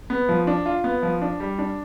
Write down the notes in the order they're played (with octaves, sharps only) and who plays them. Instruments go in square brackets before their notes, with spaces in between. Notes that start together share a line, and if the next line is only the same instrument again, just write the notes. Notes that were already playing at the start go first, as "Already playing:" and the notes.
[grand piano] B3
F3
D4
F4
B3
F3
D4
G3
D4